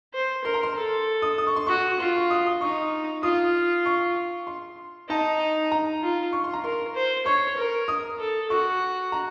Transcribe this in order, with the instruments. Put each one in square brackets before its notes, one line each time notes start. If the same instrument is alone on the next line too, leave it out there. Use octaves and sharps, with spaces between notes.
[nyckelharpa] C5
[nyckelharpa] A#4 [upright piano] C6
[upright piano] A#5
C6
[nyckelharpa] A4
[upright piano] D#6
D#6
C#6
C6
[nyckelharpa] F#4 [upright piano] C#6
[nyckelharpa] F4 [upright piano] C6
[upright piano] C#6
D#6
D#6
[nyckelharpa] D#4 [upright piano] C#6
[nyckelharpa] F4 [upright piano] D#6
[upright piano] C#6
C6
[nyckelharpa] D#4 [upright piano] A5
[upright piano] A#5
[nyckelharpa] F4
[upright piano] C#6
C6
A#5
[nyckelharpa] A#4 [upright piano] C6
[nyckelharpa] C5
[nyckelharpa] C#5 [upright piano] C#6
[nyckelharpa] A#4
[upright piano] D#6
[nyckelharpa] A4
[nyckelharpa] F#4 [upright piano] C#6
[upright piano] A#5